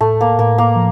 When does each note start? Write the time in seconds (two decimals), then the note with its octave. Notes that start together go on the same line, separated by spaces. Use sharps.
0.01 A2 A3
0.21 A#3
0.39 A2 A#3
0.58 A#3
0.76 F3